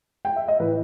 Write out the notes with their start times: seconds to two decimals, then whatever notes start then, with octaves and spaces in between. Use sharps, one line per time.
0.25 G5
0.36 E5
0.48 D#5
0.59 A2 E3 B4